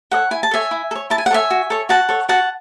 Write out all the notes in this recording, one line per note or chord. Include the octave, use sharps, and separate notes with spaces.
A4 C#5 D#5 F#5
E4 G#5
A5
A4 C#5 E5 G#5
E4
A4
C#5
E4 A5
G#5
F#5
A4 C#5 E5 G#5
F#4
A4 C#5
F#4 F#5 A5
A4 C#5
F#4 F#5 A5